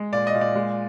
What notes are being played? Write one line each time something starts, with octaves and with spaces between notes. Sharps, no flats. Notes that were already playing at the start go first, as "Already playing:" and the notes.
Already playing: G#3
A#2 D5
D#5
A#2
D5
G#3